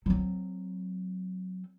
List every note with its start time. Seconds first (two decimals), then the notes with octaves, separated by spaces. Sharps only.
0.06 F#3 C4